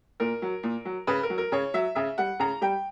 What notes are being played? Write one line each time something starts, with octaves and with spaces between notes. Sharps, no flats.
A#2 A#4
F#3
A#2
F#3
C#3 B4
A#4
F#3
A#4
C#3 C#5
F#3 E5
C#3 E5
G3 F#5
C#3 A#5
G3 G5